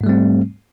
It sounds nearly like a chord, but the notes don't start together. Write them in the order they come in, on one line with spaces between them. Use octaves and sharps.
G#2 A3 G3 C4